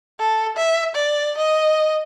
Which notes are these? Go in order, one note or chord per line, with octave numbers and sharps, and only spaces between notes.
A4
E5
D5
D#5